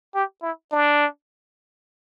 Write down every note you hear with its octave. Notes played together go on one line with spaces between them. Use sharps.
G4
E4
D4